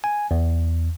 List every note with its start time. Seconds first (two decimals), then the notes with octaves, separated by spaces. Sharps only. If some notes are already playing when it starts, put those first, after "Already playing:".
0.04 G#5
0.31 E2